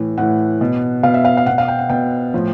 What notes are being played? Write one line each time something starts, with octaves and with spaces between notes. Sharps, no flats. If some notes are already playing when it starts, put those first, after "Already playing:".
Already playing: A2 E3
A2 E3 F#5
B2
B2 F5
E5
F5
F5
B2 F#5
F5
G5
F#5
B2 G5
A2 F3